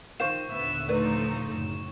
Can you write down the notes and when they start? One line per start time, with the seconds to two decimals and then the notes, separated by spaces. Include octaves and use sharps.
0.20 D#3 F3 F4 C5 F5 C#6 E7
0.51 D#2 A#2 D3 B3 E5
0.89 F3 A3 D#4 B4 D5
1.49 F#1 A2